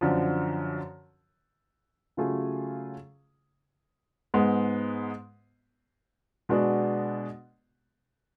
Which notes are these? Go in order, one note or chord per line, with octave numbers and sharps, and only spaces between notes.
F#2 D3 F3
C#3 F#3 A3 F4 G#4
G#2 G#3 B3
B2 G#3 B3 D4 F#4